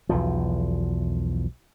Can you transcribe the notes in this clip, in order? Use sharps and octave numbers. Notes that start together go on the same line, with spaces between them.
B1 E2 F3